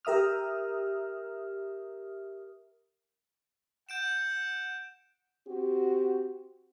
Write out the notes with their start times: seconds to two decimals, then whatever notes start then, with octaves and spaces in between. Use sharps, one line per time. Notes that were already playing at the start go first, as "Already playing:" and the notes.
0.05 G4 A#4 E5 D#6 F6
3.89 F#5 G6 D7 E7
5.47 C4 F#4 G4